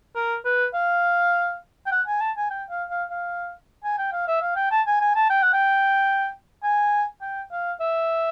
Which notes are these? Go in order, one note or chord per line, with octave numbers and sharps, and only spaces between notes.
A#4
B4
F5
G5
F#5
G#5
A5
G#5
G5
F5
F5
F5
G#5
G5
F5
E5
F5
G5
A5
G#5
G#5
A5
G5
F#5
G5
G#5
G5
F5
E5